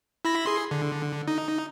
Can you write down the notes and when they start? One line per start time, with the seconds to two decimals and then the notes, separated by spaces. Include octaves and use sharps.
0.25 E4 B5 A#6
0.46 G#4 C6
0.71 D3
1.28 D#4